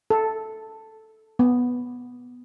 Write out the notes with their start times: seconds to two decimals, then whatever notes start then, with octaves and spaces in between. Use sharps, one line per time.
0.11 A4
1.39 B3